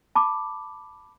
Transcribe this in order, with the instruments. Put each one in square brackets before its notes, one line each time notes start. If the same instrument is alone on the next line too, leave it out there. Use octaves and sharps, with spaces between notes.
[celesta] A5 B5 D6